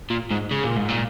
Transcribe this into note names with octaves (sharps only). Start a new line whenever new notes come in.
A#2
G#2
C#3
A#2
G#2
A#2